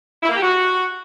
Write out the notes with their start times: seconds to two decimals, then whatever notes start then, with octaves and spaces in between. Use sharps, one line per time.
0.23 E4
0.29 A#3
0.35 G4
0.41 F#4